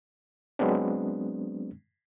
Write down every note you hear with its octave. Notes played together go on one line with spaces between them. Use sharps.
F#3 G#3 B3 C4 D4